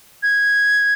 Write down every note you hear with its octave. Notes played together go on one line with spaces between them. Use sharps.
G#6